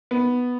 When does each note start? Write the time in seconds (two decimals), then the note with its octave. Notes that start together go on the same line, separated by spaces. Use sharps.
0.11 B3